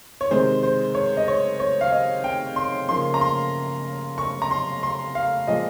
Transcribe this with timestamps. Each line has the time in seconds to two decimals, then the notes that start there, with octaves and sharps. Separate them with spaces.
0.21 C#5
0.31 C3 D#3 G#3 C5
0.63 C5
0.95 C#5
1.17 D#5
1.28 C#5
1.60 C#5
1.81 F5
1.92 D#5
2.24 G5
2.56 C6
2.89 C#3 F3 A#3 C6
3.14 A#5
3.21 C6
4.18 C#6
4.42 A#5
4.51 C6
4.83 C6
5.15 F5
5.47 A#2 F3 G#3 D#5